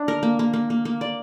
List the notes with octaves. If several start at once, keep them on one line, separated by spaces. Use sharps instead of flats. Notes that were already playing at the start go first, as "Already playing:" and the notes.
Already playing: D4
A#4
A#3
A#3
A#3
A#3
A#3
D5